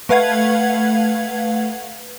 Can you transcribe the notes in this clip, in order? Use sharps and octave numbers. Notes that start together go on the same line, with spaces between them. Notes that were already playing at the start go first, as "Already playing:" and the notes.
A3 B4 F5 F#5 G#6